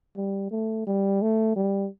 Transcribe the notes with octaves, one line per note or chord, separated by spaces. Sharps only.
G3
A3
G3
A3
G3